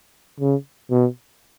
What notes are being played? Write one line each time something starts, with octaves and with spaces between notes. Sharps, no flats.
C#3
B2